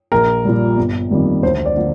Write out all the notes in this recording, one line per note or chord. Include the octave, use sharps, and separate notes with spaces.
A#1 A#4
A#2 G3
G1
F2 D#3 G3 A#3
D2 C5
D5
D3 F3 A#3